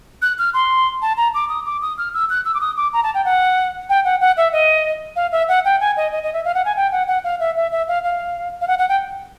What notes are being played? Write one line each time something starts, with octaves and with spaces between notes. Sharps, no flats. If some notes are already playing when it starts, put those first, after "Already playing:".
F#6
F6
C6
A5
A#5
D6
D#6
D6
D#6
F6
E6
F#6
E6
D6
D#6
D6
A#5
A5
G5
F#5
G5
F#5
F#5
E5
D#5
F5
E5
F#5
G5
G#5
D#5
D#5
D#5
E5
F5
F#5
G#5
G5
F#5
F#5
F5
E5
E5
E5
F5
F5
F5
F#5
F#5
G5